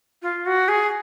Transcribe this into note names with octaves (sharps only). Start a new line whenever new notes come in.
F4
F#4
G#4